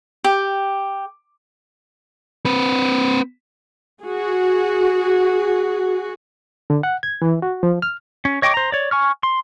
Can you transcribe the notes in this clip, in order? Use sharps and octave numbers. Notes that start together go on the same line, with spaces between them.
G4
C4 B4
F#4 G#4
D3
F#5
G#6
E3
F#4
F3
F6
C#4
C#5 D#5 G5 C#6 D6
C5 A#5
C#5 D5
G#5 C#6 F6
C6